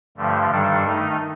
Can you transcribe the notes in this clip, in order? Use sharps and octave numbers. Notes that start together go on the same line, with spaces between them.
G2 D3 F3 A3
G2 D#3 G3 D4 A4
D#3 A3 D#4